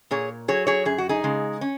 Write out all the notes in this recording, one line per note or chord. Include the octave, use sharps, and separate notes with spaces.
A#2 G#4 C#5
F#3 G#4 C#5
G#4 C#5
F#2 G#4
F#4
D#4 G#4
C#3 G#3
C#4